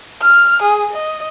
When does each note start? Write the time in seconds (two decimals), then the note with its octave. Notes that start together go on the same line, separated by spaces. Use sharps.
0.21 F6
0.62 G#4
0.93 D#5